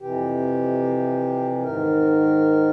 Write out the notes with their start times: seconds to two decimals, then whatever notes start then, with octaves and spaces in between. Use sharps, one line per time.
0.01 F2 C3 E3 G4
1.63 G#2 D#3 A#4